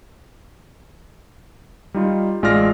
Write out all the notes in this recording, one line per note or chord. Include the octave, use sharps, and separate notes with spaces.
G3 D#4 F4
A1 G#3 F4 D5 F6 A#6